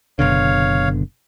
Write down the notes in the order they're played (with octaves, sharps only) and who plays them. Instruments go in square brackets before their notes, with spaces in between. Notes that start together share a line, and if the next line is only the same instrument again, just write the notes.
[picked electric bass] F#1 B2 D3 [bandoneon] C#5 F5